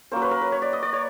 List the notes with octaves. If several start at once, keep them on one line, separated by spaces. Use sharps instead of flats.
F#3 A#3 C#4 C5
B4
A#4
B4
C#5
D5
D#5
D5
C#5